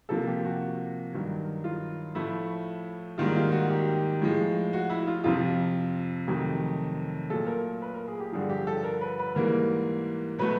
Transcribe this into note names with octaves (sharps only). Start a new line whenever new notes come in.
C3 F3 A#3 A4
G4
F#4
F#4
G2 D#3 F#3
F4
A2 F3 A3 E4
G#2 D#3 G3 A#3 F4
F4
F#4
G4
A2 F3 G#3
F#4
E4
F4
F2 C3 F3 F4
F2 C3 D#3 F#3 A3
A#2 F#3 A3 A4
A#4
B4
A#4
G#4
G4
G2 D3 F3 G#4
G4
A4
A#4
B4
B4
G#2 E3 G3 A#3 A#4
B2 F#3 A3 B4